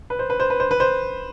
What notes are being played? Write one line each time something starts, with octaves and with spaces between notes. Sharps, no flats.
B4
C5
B4
C5
B4
C5
B4
C5